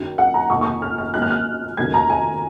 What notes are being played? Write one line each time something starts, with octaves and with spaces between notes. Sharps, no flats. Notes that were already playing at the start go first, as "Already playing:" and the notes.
Already playing: F#2 D#3 F#3
F#5
A#5
F1 D#2 D#3 A#3 C#6
C#6
D#6
F6
F6
G#1 G#2 F#3 A#3 F#6
F6
F#6
F1 D#2 C#3 F#3 A#3 G#6
A#5
G#5